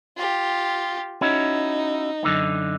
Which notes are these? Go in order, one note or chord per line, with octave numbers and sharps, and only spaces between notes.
F4 G4
C#4 D#4 E4 F#4
F#2 D3 D#4